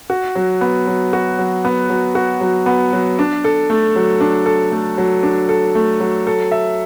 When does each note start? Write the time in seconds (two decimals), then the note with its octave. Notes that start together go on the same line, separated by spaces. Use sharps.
0.10 F#4
0.35 F#3
0.61 B3
0.87 F#3
1.13 F#4
1.39 F#3
1.65 B3
1.90 F#3
2.15 F#4
2.41 F#3
2.66 B3
2.93 F#3
3.19 D4
3.44 A4
3.70 A3
3.96 F#3
4.20 D4
4.46 A4
4.72 A3
4.98 F#3
5.23 D4
5.49 A4
5.75 A3
6.00 F#3
6.27 A4
6.52 E5